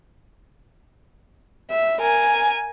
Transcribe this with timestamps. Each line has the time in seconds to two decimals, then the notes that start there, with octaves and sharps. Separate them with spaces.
1.71 E5
2.01 A#4 G#5